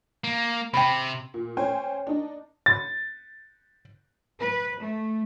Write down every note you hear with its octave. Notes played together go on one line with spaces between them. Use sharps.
A#3
C3 G5 B5
A#2
C#4 C5 G5 G#5
D4 D#4
A6
B4
A3